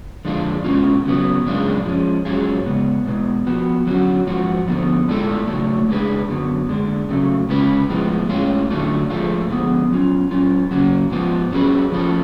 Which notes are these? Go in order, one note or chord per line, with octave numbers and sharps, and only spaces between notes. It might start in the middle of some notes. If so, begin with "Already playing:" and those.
F2 D3 G#3 D4 F4
B2 G#3 C#4 F4
C#3 F#3 B3
F#2 C#3 G#3 D4 F4
F3 G#3 C#4
G#2 F#3 C#4 F4 G#4
C#3 G#3 B3
B2 G#3 B3
F3 B3 F#4
D3 F#3 C#4 F#4
G#2 F3 F#4
D3 F3 B3
A2 G#3 D4 F4 A4
C#3 F#3 A3
C#3 G#3 D4 G#4 B4
F#2 D3 F#3 B3
D3 G#3 D4
C#3 F#3 A3
C#3 G#3 C#4 F4 B4
A2 F3 G#3 B3
A2 G#3 C#4 F4 G#4
D3 F#3 A3 D4 F4
G#2 F3 A3 F4 G#4
D3 F3 G#3 B3
F#3 C#4 F4
F#3 C#4 F4
C#3 F#3 C#4 F#4
G#2 F3 B3 F4
F#3 C#4 G#4 B4
F3 A3 C#4 F4 A4